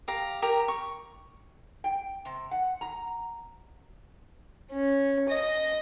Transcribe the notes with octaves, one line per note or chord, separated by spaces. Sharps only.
G4 F5 A#5
G4 A#4 A#5
C#6
G5
C3
F#5
A#5
C#4
D#5